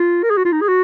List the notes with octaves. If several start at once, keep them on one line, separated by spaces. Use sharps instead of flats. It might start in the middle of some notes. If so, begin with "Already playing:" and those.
Already playing: F4
A#4
G#4
F#4
F4
D#4
G#4
F#4